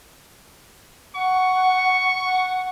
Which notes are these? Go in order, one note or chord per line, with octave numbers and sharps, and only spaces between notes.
F#5 C#6
F#5